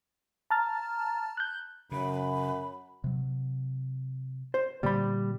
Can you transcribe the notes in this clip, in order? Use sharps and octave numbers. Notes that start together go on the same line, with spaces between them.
A5 A#5 F6 A6
F#6 G6
F#2 C#3 B5
C3 F#3
C5
A#2 D3 G3 A#3 B5